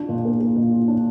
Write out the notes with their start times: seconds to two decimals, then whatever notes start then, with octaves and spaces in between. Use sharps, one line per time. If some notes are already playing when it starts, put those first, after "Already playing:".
Already playing: D4 F4
0.09 A#2
0.25 A#3
0.41 A#3
0.57 A#2
0.72 F4
0.88 D4